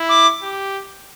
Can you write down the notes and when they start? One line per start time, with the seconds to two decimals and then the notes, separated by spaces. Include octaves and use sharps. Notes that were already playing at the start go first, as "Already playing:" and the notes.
Already playing: E4
0.09 D6
0.43 G4